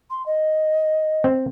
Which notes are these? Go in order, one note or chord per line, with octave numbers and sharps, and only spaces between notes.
C6
D#5
C4